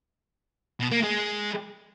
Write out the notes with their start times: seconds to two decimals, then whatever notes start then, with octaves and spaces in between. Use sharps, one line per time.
0.80 B2
0.91 A#3
1.03 G#3